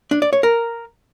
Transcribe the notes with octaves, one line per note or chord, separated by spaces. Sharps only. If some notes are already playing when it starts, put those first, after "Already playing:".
D4
D5
C#5
A#4